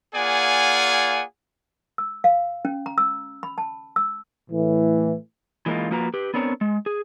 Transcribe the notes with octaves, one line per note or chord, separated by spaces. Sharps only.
A#3 F4 G#4 D5 F#5 G#5
E6
F5
C#4
A#5
E6
B5
A5
E6
A2 E3
E3 G#3 A#3 C#4 D#4 F4
F3 A#3 F4 F#4 B4 A#5
G4 B4
B3 C4 D4 A#4 C#5
G#3
G#4